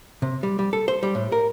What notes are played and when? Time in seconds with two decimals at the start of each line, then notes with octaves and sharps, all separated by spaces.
0.22 C3
0.43 G3
0.59 G3
0.73 A4
0.88 C5
1.03 G3
1.15 A2
1.32 A#4